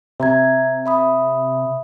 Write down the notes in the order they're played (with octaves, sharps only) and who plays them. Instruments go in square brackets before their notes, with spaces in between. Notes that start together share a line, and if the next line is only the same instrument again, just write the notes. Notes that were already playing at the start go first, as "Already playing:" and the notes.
[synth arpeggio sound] C3 [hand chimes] E5 A#5 G#6
[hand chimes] E5 B5 D#6